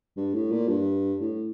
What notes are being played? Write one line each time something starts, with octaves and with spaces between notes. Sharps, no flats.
G2
A2
A#2
G2
A2